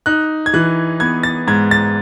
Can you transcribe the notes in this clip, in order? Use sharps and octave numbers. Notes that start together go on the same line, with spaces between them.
D#4 F#6
G#6
E3 F#6
B3 G#6
A6
G#2 G#6
A6